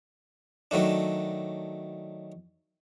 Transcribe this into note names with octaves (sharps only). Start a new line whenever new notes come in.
D#3 F#3 A3 D4